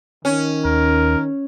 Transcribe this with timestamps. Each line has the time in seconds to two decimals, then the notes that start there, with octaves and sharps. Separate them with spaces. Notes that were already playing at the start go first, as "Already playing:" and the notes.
0.25 D#3 C#4
0.65 D#2 A#4